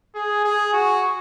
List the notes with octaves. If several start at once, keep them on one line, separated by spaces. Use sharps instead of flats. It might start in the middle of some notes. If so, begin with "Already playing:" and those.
G#4
G#4
F#4